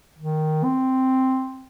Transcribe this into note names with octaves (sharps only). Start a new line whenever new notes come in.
D#3
C4